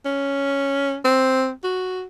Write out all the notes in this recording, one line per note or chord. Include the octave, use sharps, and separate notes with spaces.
C#4
C4
F#4